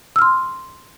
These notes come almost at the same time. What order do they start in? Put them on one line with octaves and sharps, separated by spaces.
E6 F6 C6